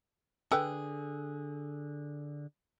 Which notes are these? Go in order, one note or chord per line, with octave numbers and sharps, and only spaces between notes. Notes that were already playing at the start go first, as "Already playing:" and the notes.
D3 G#4 A4 B4 G5